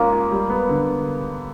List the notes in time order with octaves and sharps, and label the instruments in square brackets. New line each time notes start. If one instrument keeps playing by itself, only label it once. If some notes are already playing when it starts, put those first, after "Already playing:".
Already playing: [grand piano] G#3 C#4 F4 A#4 [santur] A#3
[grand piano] F4
G3
B3
D3